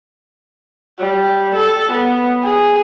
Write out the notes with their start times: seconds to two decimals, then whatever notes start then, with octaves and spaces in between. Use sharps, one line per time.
0.99 G3
1.55 A4
1.92 B3
2.44 G#4